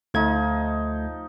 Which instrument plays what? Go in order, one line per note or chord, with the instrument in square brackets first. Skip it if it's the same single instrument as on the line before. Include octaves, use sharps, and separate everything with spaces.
[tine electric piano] D2 A3 G#6 [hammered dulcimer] F3 D#4